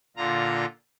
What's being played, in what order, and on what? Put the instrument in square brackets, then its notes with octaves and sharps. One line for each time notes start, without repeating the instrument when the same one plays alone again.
[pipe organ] A#2 D3 F4 A#5